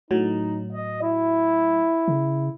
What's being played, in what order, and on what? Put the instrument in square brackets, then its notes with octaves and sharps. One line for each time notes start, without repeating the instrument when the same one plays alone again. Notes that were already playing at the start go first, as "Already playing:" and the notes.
[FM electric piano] A2 F#3 [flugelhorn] D#4
[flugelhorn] D#5
E4
[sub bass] C#3